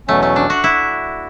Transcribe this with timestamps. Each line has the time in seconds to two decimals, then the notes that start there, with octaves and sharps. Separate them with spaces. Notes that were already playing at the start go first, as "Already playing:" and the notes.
0.08 E2 B2 F#3 A3 C#4
0.22 A3
0.36 D4
0.50 F#4
0.64 E4